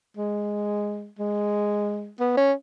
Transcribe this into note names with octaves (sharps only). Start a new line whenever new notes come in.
G#3
G#3
B3
C#4